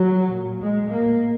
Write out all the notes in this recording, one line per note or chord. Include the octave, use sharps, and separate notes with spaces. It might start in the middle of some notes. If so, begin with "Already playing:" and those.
Already playing: F#3
A#2
G#3
A2 A#3